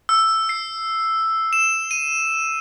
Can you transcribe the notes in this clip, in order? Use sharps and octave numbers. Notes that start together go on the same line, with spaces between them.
E6
C7
E7
D#7